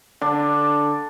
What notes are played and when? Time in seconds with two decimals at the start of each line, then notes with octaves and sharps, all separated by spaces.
0.22 D3 D4